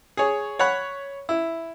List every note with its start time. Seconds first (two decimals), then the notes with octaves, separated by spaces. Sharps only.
0.17 G#4 C#5
0.59 C#5 F#5 B5
1.29 E4